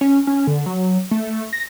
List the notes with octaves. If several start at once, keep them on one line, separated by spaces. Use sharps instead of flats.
C#4
C#4
D3
F#3
A3
A#6